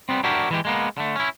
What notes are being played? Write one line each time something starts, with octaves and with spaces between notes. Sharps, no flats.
G3 B3 C4
D4 E4 F#4 G4 A#4 D5
E3 G#3 G4
G#3 A#3 B3
D3 A3
C#4 E4